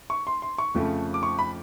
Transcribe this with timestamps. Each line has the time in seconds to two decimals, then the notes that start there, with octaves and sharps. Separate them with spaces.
0.10 C#6
0.27 C6
0.42 C6
0.58 C#6
0.74 F2 C#3 F3 A3
1.14 D6
1.23 C#6
1.39 B5